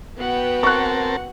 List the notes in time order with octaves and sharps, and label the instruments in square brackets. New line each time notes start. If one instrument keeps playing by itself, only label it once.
[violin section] B3 G5 [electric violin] F#4 F#5
[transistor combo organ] C4 A#4 A5 [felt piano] C#6 F#6